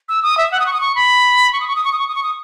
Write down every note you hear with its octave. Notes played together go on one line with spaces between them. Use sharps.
E6
D#6
E5
F#5
D#6
C#6
D#6
C#6
B5
C#6
D#6
C#6
D#6
C#6
D#6
C#6
D#6
C#6
D#6